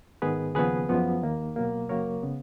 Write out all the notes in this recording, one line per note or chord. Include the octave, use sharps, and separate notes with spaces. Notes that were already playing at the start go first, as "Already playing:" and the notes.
G#2 D#3 G#3 B3 G#4 B4
D#2 C#3 F3 B3 G#4 B4
F#2 F3 G#3 B3
D#2 D#3 A#3
B2 F#3 A#3
F#2 C#3 F#3 A#3 A#4 C#5
C#3 G#3 B3